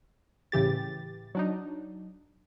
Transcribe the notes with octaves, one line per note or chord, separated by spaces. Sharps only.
A2 C#3 E3 G4 A6
F#3 D4 D#4